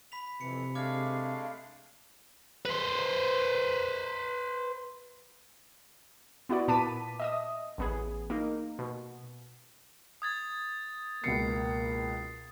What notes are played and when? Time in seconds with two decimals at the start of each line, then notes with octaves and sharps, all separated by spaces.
0.12 B5 B6 F7
0.41 F2 C3 E3 C#7
0.75 G#3 A3 D4 F5 D6 F6 G#6
2.65 B4 C5
6.49 B3 E4 F#4 D5
6.68 A#2 B3 A5 D6 B6 D#7
7.20 D#5 E5 D#6
7.78 A1 B3 G#4
8.30 A#3 D#4
8.79 B2
10.22 D#6 G#6 A6
11.24 C#2 B2 A#3 C7 C#7